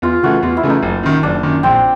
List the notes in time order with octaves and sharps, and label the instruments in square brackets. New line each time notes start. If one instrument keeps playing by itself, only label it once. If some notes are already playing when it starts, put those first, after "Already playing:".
[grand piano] E2 [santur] F4
[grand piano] C#3 E3 A3 [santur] F#4
[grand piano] E2 [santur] F4
[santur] E4
[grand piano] C#3 E3 A3
[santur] D#4
[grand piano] F#1
F#2 D#3
[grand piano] F#1 [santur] D4
[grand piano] F#2 D#3
[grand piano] A#1 [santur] C4